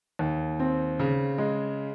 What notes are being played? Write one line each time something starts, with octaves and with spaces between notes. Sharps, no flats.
D#2
C4
C#3
G#3